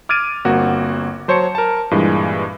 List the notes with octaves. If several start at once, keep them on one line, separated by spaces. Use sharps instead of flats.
D6 F6 G#6 A6 D7 D#7
G1 A#3 C4 F#4
F#3 C5 C#5 A5 C#7
A#4 A5
G2 A#2 E3 G#3